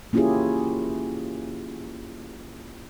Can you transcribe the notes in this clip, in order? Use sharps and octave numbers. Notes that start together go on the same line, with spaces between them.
A#3 C#4 E4 F4 G4 G#4